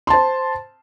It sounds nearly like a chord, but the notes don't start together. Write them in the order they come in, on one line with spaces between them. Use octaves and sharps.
C6 A5 C5